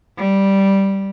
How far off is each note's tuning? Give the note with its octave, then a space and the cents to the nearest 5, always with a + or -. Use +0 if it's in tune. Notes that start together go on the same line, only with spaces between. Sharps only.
G3 -5